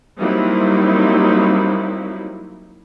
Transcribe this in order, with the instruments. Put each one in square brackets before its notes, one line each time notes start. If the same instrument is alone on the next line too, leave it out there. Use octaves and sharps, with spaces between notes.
[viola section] F#3 G3 A#3 C4 D#4 E4